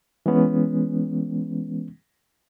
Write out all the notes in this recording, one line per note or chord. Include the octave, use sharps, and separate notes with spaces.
E3 G#3 B3 C#4